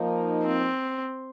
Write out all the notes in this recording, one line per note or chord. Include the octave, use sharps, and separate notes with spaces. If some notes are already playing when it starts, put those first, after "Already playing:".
Already playing: F3 A#3 D#4
C4